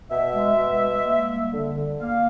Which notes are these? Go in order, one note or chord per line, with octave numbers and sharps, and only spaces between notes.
B2 E5
G#3
B2
G#3
A#3
G3
D3
D3
A#3 F5